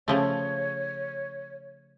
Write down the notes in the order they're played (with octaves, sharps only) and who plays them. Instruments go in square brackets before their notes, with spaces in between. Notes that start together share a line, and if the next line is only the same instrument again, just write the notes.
[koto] C#3 F3 A3 [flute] C#5